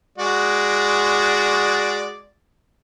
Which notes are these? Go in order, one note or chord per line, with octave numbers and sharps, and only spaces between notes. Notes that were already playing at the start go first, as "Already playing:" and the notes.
G#3 F#4 D5